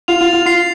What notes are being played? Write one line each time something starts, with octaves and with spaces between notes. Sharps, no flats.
F4 F7
F4
A6
F4
F4 C7